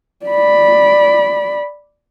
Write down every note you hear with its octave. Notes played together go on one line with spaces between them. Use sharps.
D5 B5